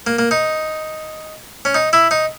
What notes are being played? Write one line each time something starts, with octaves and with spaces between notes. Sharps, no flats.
A#3
A#3
D#4
C#4
D#4
E4
D#4